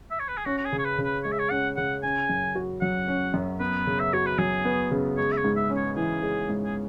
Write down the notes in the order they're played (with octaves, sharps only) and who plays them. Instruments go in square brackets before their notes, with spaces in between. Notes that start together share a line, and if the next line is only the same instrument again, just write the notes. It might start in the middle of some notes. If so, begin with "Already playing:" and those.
[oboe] E5
C#5
B4
G#4
[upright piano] C#4 [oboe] F#4
[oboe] F#4
G#4
[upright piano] C#3
[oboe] C#5
B4
[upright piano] C#3
[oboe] B4
[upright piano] G#3 [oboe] C#5
[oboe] E5
C#5
[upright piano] C#4 [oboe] F#5
[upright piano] C#3 [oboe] F#5
[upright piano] C#4 [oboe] G#5
[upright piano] F#2
F#4
[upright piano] F#3 [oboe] F#5
[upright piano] C#4
F#2
[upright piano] B3 [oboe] B4
[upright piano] C#3
[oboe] E5
[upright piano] F#4 [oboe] C#5
[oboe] B4
[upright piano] F#3 [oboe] G#4
[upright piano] B3
C#3
[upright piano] G#3 [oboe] C#5
[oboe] E5
C#5
[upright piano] G#2
[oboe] E5
[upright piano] C#4
[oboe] C#5
[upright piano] E3 [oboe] G#4
[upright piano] G#3
G#2
[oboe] G#4